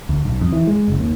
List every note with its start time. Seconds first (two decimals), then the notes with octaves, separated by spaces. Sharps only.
0.09 D2
0.25 B1
0.41 F2
0.52 E3
0.67 G#3
0.88 F#1
1.00 D#2